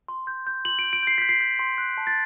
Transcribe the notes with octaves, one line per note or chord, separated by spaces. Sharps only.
C6
G6
G6
C6 F#7
D7
G6
D7
G6 C7
G6 B6
C7
G6
C6
F#6
A5
A6